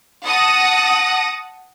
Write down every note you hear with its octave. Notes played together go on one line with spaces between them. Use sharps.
F#5 A5 D#6 A#6